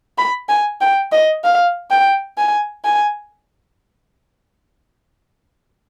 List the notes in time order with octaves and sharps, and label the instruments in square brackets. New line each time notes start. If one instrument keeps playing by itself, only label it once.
[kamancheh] B5
G#5
G5
D#5
F5
G5
G#5
G#5